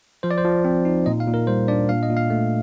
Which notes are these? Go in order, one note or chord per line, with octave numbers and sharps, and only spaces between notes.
F3 C5
D5
C5
F3
C4
D#4
A#2 D#5
F5
A#2
A#4
G3 C5
D4 D5
A#2 F5
D#5
A#2
F5
A3